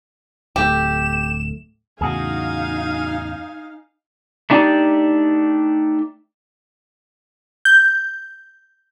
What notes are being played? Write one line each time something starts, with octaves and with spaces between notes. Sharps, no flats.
D1 A3 G4 E7
E2 A2 C#3 D#4 F#4 G#4 F5 G#5
A3 D4 D#4 G4 D5
G6